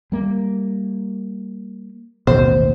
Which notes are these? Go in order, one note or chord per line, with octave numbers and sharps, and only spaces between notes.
G3 A#3
A1 D#2 B2 C5